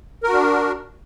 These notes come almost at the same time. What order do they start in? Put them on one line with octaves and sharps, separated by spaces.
A#4 F#4 D4